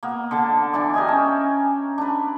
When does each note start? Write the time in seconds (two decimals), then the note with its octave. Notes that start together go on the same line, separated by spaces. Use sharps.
0.03 A#3 B3
0.31 D3 D4 A5
0.73 E3 D4 E4 D5
0.94 G4 A#4 D#5 G#5
1.08 C#4 E5
1.98 D4 B4